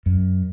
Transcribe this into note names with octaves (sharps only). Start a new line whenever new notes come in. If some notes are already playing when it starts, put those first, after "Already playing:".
F#2